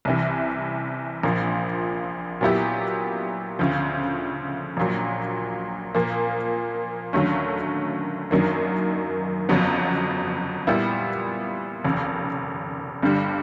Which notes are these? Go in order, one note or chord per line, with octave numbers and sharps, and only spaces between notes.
C2 C3 E3
A#1 A#2 F3
A#2 F#3 B3 E4 G4
D2 C#3 F3
A#1 A#2 F#3
A#2 F3 A#3
D#2 D3 F#3 A3 C#4
F#2 D#3 F#3 A#3 D4
G1 F2 C#3 F#3 B3
A#2 G3 B3 E4
F1 D#2 C#3
G1 G2 D3 G3